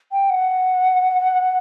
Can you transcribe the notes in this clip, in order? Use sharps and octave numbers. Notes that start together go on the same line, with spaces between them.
G5
F#5